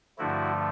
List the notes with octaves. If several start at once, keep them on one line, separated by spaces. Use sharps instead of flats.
G2 D3 F3 A3 E4 F#4